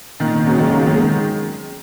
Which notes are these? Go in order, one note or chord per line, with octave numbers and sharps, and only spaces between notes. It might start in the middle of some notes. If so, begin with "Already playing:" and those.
A#2 D#3
C#3 F#3
D#3 G#3
F#3 A#3
D#3 G#3